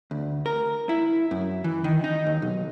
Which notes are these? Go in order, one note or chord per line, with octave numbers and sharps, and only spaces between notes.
D2
A#4
E4
F#2
E3
D#3
D#4
D#2
B1